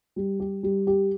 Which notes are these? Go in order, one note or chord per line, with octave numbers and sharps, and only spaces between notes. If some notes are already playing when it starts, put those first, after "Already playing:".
G3
G4
G3
G4